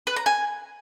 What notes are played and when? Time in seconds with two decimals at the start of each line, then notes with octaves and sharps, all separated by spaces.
0.07 B4
0.16 A#5
0.26 G#5